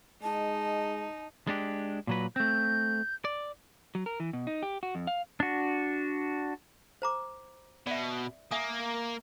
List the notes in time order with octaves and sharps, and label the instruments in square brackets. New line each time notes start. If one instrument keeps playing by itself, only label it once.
[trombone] G#3 [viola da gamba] D#4 [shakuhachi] A5
[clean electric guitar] G#3 D4 G4
A#2 F#3 B4
[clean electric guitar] A3 C4 [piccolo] G6
[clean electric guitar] D5
[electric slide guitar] F#3
A#4
E3
B2
D#4
G4
F#4
F2
F5
[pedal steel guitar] D4 F#4
[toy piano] C5 A#5 D6
[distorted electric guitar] B2 [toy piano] D5 E5
[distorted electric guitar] A#3 [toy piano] E5 G#5 D#6